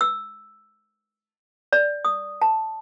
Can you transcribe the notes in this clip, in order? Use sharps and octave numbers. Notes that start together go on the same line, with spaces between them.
E6
D5
D#6
A5